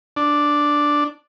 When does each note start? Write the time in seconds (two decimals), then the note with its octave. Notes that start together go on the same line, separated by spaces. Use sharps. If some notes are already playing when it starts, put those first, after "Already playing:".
0.17 D4